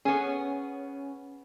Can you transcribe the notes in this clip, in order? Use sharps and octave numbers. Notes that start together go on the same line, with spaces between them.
B3 C#4 G#4